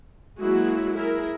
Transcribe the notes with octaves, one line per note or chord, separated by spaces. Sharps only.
F#3 G#3 A#3 E4 F#4 G#4
E4 G#4 A#4